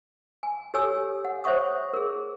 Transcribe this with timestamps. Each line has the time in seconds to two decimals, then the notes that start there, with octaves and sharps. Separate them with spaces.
0.43 G#5
0.74 G4 A4 C#5 G#5 E6
1.25 F#5
1.44 C5 C#5 E5 F#5 C#6 D#6
1.93 G#4 A#4